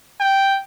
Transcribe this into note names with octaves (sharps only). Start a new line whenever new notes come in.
G5